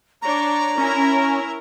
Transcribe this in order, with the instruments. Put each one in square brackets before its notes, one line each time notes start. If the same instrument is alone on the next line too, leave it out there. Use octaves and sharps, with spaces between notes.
[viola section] D4 C#5 D5 [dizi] A#5
[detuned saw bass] C#4 [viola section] E4 A#4